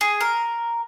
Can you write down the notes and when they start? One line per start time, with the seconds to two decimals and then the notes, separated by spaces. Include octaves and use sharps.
0.01 G#4
0.21 A#4